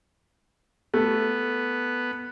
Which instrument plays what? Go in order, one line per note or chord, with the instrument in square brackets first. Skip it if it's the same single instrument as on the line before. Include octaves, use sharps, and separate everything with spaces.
[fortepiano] A3 [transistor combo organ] B3